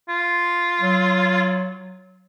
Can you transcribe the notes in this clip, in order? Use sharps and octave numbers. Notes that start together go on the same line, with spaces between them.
F4
F#3